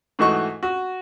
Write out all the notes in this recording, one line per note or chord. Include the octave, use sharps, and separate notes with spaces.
G#2 E3 A3 F#4 D#5 C#6
F#4